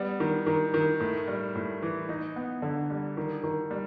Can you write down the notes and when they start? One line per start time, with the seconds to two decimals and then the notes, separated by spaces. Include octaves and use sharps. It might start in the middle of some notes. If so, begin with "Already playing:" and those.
Already playing: G3 B3
0.20 D#3
0.46 D#3
0.74 D#3
1.00 A2
1.28 G3
1.55 A2
1.82 E3
2.09 D#4
2.36 B3
2.62 D3
2.90 G3
3.17 D#3
3.44 D#3
3.71 G3